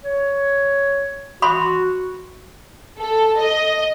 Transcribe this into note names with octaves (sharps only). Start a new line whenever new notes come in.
C#5
F#4 B5 C6
A4
D#5